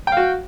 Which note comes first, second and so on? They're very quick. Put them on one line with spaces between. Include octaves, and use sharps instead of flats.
G5 F5 F#4